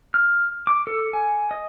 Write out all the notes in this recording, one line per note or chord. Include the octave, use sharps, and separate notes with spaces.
F6
D6
A4
G#5
D#5